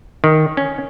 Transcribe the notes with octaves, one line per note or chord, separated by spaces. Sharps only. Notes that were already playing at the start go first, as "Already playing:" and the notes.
D#3
C#4